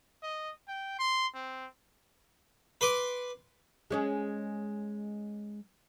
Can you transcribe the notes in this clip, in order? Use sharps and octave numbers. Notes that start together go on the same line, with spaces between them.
D#5
G5
C6
C4
B4 C6 D6
G#3 C#4 G#4